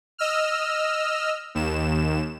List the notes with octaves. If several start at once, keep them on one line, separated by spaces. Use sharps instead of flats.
D#5 E6 F6
D#2 E7